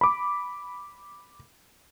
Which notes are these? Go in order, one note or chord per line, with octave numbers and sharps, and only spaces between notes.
B5 D6